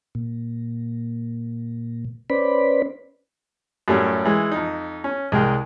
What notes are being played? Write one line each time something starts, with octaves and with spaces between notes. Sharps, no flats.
A#2
C#4 B4 C5 D5 B5
F#2 A2 G3 A3 C#4
E3 G#3
F2 D#4
C#4
C2 G#3 A#4 G5